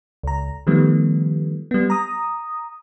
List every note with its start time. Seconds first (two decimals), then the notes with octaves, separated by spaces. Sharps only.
0.23 C#2 A#5
0.67 D#3 F3 G3 A3 B3
1.71 G3 B3
1.90 A#5 D#6